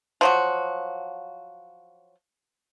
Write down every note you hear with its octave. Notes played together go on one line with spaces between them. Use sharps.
F3 F#3 F#4